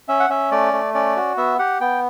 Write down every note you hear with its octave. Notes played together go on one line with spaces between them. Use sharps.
C#4 E5
F#5
C#4 E5
A3 D5
A3
C#4 D5
F#4
B3 E5
G4 F#5
B3 G5